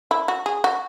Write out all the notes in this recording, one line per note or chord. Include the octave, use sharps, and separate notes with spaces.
E4
F#4
G#4
F#4